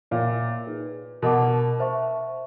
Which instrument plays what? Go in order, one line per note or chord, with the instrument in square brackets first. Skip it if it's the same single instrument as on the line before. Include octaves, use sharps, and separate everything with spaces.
[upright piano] A#2 [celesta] C#5 E5 G5
[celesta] D#4 G#4 B4
[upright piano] B2 [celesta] A#4 D#5 F#5 A5 D6
[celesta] C5 E5 A5 C#6